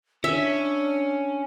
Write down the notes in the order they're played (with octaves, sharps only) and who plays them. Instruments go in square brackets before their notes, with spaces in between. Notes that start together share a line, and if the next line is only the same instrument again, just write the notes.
[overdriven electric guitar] C#4 [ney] D4 [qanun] E5